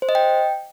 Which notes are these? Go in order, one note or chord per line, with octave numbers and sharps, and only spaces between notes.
C5
D#5
G5